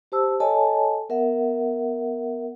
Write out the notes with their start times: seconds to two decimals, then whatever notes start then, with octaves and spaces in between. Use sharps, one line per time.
0.12 G4 C5 A5 E6
0.40 A4 C#5 D#5 G#5 A5
1.09 B3 A#4 E5 F#5